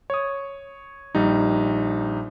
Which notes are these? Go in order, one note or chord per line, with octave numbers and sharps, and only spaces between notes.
C#5 D#6
A#1 G3 D#4